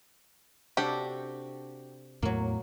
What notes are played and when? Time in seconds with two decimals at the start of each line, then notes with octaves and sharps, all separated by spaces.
0.77 C3 D4 F#4 G4 A4
2.22 E2 A2 F#3 A3 A#3